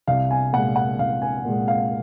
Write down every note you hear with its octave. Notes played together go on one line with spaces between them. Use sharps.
C2 F5
G#5
A#2 G#3 F#5
F#5
C2 F5
G#5
A#2 G#3
F5